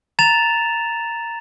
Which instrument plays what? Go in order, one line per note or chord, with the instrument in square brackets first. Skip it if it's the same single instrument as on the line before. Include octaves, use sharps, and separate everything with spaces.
[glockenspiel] A#5 A6 E7 F7